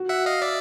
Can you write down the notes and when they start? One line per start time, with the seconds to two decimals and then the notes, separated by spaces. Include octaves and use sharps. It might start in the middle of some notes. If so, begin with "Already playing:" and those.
Already playing: F#4
0.09 E5 F#5
0.26 D#5 F5
0.42 D5 E5